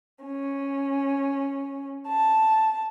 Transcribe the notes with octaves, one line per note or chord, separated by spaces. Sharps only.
C#4
A5